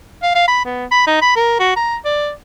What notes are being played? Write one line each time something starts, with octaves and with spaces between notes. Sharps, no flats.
F5
F5
B5
B3
B5
D#4
B5
A#4
F#4
A#5
D5